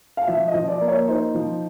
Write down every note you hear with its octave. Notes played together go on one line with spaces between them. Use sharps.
F5
F3 E5
D#5
F3
D5
A#3
C#5
D#4 C5
F3